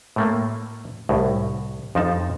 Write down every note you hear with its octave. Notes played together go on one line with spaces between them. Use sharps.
A2 A3 A#3
C2 A2
F2 F3 D#4 A5